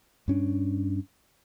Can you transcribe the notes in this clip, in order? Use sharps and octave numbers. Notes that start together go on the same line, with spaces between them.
G2 C#4 D4